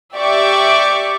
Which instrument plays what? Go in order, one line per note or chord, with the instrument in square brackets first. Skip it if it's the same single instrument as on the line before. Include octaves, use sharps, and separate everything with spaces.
[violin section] G4 D5 E5 C#6 D6